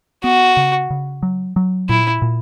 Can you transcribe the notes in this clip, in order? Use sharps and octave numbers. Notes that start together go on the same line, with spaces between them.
B3 F#4
C#3
C#3
F#3
F#3
A#2 E4
A#2